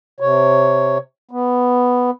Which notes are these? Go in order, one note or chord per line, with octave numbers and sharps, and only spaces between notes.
C3 C#5
B3